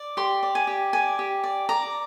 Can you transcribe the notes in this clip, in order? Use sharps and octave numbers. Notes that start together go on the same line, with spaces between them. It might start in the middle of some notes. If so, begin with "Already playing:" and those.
Already playing: D5
G4 C6
D5
G#5
G4
D5 G#5
G4
D5
D5 A#5